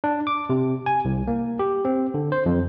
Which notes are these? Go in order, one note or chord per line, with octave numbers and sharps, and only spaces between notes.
D4
D6
C3
G#5
C2
A#3
G4
C4
D3
C5
F2